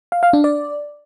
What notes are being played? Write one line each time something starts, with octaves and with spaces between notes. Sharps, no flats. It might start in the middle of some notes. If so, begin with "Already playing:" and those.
F5
F5
D4
D5